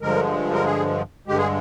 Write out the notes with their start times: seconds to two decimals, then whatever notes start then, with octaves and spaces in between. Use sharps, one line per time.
0.02 G2 D3 F3 G#3 A#4
0.54 A#4
0.65 G#4
1.27 G2 D3 G#3 G4
1.38 G#4